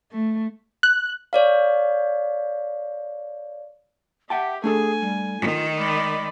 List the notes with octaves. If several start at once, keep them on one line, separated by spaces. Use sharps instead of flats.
A3
F#6
C#5 D5 F5
G4 E5 F#5 G5 A5
A3 D4 G#4 A4 G#5
G3
D#3 F4
G#3 D5 B5